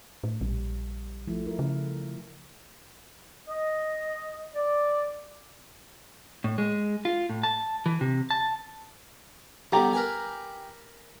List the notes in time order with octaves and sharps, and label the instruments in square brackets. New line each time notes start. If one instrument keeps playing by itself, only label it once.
[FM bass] A2
[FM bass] A#1 [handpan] G3
[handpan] F3 A3 E4
E4 A#4
[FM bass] C#3
[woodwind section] D#5
D5
[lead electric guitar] A2
G#3
F4
A2
A5
E3
C3
A5
[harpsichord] D3 G3 B3 [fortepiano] G4 A#5
[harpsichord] A#4 B4 G#5